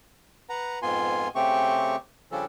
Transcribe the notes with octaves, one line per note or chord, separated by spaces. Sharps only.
B4 F#5 A#5
F2 G#2 B3 F4 G#5 C6
C#3 A3 C4 G4 C#6
C#3 F3 G3 C#4 D4 A4